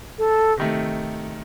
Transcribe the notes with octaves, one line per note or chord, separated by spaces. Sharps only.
A4
C3 D#3 A3